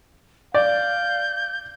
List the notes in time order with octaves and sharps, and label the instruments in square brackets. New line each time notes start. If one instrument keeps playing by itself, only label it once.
[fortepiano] D5 [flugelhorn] F5 [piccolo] G6